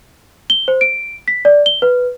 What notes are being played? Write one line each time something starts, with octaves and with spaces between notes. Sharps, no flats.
G7
C5
D7
B6
D5
G7
B4